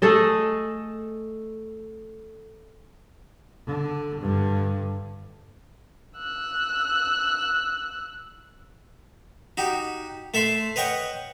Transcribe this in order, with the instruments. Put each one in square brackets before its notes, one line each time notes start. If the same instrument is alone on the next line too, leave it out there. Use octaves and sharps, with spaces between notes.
[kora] A3 G#4 A4 D#5
[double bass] D3
G2 D3
[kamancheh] E6 F#6
[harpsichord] D#4 F#4 G4
A3 A4 E5 C6
B4 C#5 D#5 F#5 G5 C#6